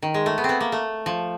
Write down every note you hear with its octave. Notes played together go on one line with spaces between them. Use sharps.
D#3
G#3
A3
B3
C4
B3
A#3
A3
F3